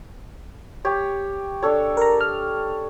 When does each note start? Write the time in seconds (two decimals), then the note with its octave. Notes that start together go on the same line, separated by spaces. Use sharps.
0.85 G4 C#5
1.62 D4 A4 C#5
1.97 A#4 A#5
2.21 F6